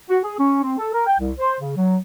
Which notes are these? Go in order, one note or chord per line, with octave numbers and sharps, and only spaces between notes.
F#4
G#4
C#4
C4
A4
A#4
G5
C2
C5
C#3
F#3